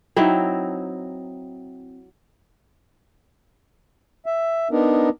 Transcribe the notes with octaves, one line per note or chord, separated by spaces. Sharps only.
F#3 C4 D#4 E4
E5
B3 D4 D#4 A#4